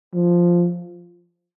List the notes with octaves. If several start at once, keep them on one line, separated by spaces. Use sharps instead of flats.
F3